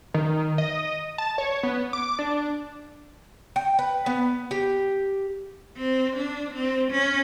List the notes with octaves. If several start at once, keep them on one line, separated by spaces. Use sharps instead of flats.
D#3
D#5
A5
C#5
B3
D6
D4
G5
B4
B3
G4
C4
D4
C4
C#4